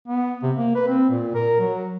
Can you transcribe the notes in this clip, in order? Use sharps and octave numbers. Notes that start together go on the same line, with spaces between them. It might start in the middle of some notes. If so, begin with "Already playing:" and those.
B3
C3
A#3
B4
C4
A#2
A#4
F#3